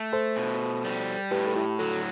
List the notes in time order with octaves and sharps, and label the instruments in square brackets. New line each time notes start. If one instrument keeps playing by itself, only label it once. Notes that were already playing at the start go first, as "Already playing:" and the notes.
Already playing: [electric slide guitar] A3
[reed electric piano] A4 C5
[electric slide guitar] B2
G3
[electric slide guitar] A2 [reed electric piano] G4 B4
[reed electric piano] A4
E4 G4
[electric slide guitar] F#3 [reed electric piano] F#4 A4